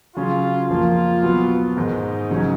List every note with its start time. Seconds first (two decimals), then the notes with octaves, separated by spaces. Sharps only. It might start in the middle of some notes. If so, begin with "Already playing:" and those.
0.16 C#3 F#3 C#4 F4
0.69 F2 F3 A#3 F4
1.23 B2 F#3 B3
1.77 G#2 D#3 G#3 D#4
2.30 C#3 F#3 C#4